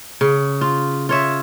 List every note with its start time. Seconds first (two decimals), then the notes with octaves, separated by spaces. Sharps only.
0.21 C#3
0.61 F4
1.09 F4 C#5 E5